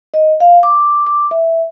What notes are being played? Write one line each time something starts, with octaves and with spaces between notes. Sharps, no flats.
D#5
F5
D6
D6
E5